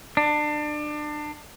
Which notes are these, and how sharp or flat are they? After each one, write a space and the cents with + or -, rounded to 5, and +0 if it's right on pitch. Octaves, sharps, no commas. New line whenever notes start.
D4 +30